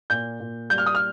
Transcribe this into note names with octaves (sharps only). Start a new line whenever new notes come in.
A#2 G6
A#2
G3 G6
F6
D#6
F6